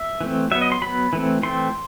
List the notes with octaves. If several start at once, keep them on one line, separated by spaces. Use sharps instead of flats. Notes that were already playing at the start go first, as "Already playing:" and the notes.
Already playing: E5
E3 A3 C4
F#3 B3 E5
D#5
C6
F#3 B3 B5
E3 A3 C4
E3 A3 C4 C6